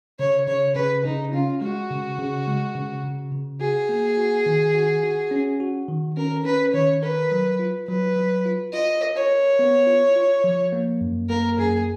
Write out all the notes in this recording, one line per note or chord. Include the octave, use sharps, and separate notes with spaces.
C#3 C#5
C#3 C#5
C#3 B4
C#3 D#4
C#4 F4
G#3 F#4
C#3
C#3
G#3
C#3
C#3
C#3
F#4 G#4
A#3
F#4
D#3
F#4
F#4
C#4
F#4
D#3
C#4 A#4
C#4 B4
D#3 C#5
A#4 B4
F#3
F4
F#3 B4
F#3
F4
F4 D#5
A#4
C#5
A#4
B3
F4
F4
F3
A#3
F#2
A#3 A#4
F#2 G#4